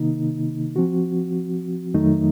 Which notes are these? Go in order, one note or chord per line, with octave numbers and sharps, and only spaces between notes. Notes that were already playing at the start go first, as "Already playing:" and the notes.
Already playing: C3 D#3 A#3 D#4
F3 C4 F#4
F2 D#3 F#3 A3 D#4